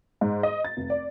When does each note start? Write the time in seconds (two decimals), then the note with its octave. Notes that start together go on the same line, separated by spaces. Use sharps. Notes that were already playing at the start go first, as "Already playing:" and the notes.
0.21 G#2
0.43 D#5
0.65 A6
0.77 F1
0.90 D5